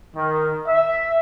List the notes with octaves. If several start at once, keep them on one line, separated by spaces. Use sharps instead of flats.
D#3
E5